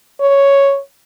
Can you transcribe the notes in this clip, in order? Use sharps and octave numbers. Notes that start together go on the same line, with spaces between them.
C#5